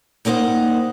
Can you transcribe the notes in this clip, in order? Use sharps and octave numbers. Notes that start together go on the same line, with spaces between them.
G3 A#3 D#4 C5 F#5